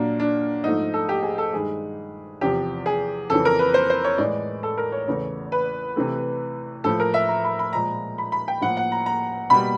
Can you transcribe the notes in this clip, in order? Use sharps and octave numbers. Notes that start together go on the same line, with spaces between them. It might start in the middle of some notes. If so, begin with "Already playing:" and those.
Already playing: A#2 F#3 A#3 D4
D4
G#2 F3 A3 D#4
A4
G4
G#4
A4
G2 D#3 G#3 G#4
E2 C3 F3 G4
G#4
F2 C#3 E3 A4
A#4
B4
C5
C5
C#5
A2 E3 G#3 D5
A4
A#4
C#5
E2 C#3 E3 A3
B4
C3 E3 A3
A2 F3 A3 A4
A#4
E5
A#5
B5
B5
A#2 F3 G#3 A#5
B5
B5
G5
A2 F3 A#3 F#5
F#5
A#5
A#5
B2 G3 A#3 B5